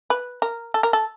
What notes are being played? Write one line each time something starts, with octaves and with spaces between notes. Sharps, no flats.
B4
A#4
A4
A#4
A4